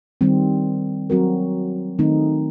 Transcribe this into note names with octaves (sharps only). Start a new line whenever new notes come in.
D#3 G3 C4
F#3 C4 F#4 A#4
D#3 A3 C4 D#4